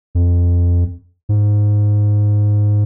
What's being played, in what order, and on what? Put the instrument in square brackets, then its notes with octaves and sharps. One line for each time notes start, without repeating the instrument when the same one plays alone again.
[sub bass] F2
G#2